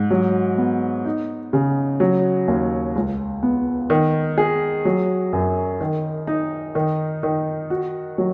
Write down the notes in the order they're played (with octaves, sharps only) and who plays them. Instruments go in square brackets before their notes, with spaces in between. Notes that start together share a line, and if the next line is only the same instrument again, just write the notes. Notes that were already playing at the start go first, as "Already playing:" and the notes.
Already playing: [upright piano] G#2
F#3
B3
D#4
C#3
F#3
D#2
C#2
B3
D#3
G#4
F#3
F#2
D#3
D#4
D#3
D#3
F#4
F#3